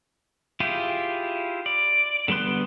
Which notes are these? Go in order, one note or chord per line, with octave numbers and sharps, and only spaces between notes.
E4 F4 G4 G#4
D5
D3 G3 B3 C6 F#6